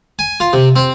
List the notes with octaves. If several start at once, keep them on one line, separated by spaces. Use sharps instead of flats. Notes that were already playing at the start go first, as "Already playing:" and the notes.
G#5
F4
C3
C4